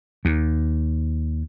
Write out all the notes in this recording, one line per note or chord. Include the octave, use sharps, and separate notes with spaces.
D#2